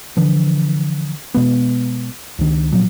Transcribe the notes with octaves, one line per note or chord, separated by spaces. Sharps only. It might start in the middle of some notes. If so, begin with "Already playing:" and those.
D3 E3 F3
B2 G#3 B3
C#2 D#3
A#2 F3 F#3